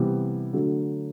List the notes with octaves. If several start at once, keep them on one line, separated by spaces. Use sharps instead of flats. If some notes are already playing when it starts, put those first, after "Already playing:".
Already playing: C3 E3 G3 B3
D3 F#3 A3